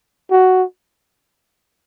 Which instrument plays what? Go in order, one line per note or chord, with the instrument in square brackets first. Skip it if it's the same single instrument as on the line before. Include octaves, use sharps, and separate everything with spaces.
[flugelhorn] F#4